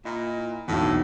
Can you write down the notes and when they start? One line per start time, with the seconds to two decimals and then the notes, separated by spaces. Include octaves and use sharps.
0.05 A#2 E4 D#5
0.68 B1 E2 A2 B3 D4